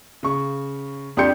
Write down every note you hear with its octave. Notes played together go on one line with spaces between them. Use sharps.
C#3 C#6
F2 D4 G4 C6 G6 C#7